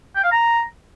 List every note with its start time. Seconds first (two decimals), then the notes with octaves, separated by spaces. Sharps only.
0.16 G5
0.24 F5
0.32 A#5